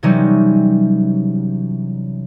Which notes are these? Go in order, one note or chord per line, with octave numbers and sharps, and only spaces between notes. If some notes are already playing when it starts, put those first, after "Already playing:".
C3 E3 F#3 G3 C#4 D#4